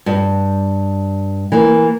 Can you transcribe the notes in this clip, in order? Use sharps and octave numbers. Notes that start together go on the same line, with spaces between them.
G2
E3 A#3